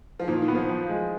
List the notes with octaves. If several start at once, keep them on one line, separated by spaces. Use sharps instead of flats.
F3
A#2 D#3
D#3
B3
F3
F3
G#3